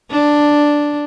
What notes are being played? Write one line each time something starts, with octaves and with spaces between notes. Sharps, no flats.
D4